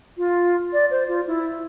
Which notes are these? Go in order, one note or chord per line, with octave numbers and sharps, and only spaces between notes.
F4
D5
C5
F4
E4